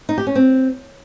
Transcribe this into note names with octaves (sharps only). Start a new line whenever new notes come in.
D#4
G4
C#4
C4